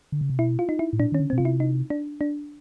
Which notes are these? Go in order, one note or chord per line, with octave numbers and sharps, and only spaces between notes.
D3
C#3
C3
B2 E4
F4
D#4
E4
A2
A#2 D4
D#3 C#4
D3
C4
B2
C3 F4
E4
D#4
D4
D4